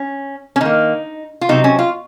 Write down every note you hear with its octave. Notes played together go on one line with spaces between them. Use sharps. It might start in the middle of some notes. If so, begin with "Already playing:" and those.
Already playing: C#4
C#4
D#3 A#3 D#4
F4
C3 F#3 C4 D#4
C#4
F4